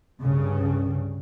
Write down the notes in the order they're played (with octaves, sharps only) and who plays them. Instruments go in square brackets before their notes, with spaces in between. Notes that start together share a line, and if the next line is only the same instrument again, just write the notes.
[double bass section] C2 G2 C#3